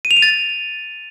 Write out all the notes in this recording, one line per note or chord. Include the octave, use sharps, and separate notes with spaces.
D#7
F7
D#7
A6